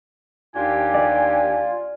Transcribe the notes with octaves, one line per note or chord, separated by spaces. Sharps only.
D#2 D4 F4 G4 G#5
D5